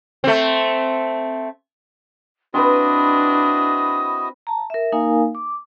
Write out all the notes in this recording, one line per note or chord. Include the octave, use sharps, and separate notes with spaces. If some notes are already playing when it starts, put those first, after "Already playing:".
A3 C4
C4 D4 E4 F#4 B4 D#5 D#6
A5 A#5
A#4 E5
A#3 D#4 A#4 F5 G#5
D6